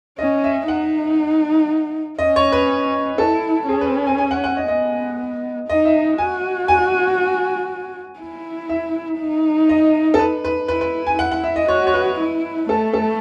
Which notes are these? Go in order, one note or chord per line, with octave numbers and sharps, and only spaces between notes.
C#4 D#5
E5
D#4 F#5
C#4 D#5
C#5
B4
E4 A4
C#4 G#4
B4
G#5
G#5
F#5
F#5
D#5
B3 D#5
D#4 D#5
E5
F#4 G#5
G#5
E4
E5
D#4
D#5
A4
B4
B4
E4 B4
B4
G#5
E4 F#5
F#5
E5
D#5
F#4 C#5
C#5
B4
E4
A3 A4
A4